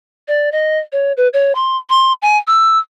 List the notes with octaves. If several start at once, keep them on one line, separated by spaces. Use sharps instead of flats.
D5
D#5
C#5
B4
C#5
C6
C6
G#5
E6